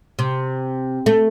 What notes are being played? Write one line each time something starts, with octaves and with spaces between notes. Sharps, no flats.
C3
A3